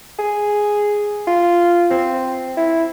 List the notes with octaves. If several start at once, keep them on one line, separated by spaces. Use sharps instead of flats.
G#4
F4
C4
E4